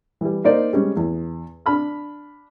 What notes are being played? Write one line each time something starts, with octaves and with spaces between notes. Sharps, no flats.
E3 G3
A#3 D#4 C5 D5
G3 G#3 C#4
E2
D4 B5 F6